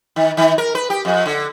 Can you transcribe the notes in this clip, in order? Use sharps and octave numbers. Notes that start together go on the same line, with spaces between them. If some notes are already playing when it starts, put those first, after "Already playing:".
D#3
D#3
A#4
B4
G4
F2
D3